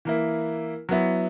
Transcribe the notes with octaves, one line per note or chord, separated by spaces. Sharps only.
E3 A#3 E4
F#3 B3 E4